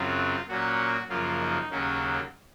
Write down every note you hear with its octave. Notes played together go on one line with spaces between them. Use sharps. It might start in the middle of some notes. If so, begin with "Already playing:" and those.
Already playing: F#2 C#3 F#3 C4 F4
A#2 F#3 A#3 C#4 F#4
F#2 C#3 F3 A#3 F4
D#4
D#2 C#3 F#3 A#3 C#4